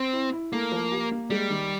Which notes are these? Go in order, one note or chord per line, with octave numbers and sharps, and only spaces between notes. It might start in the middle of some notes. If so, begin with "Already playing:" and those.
Already playing: C4
E4
E4
A3 A#3
F3
G4
A#3
G3 G#3
D#3